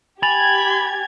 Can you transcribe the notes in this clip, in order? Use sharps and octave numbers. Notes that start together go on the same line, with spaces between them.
G4 G#5 B5 G#6 A6 F7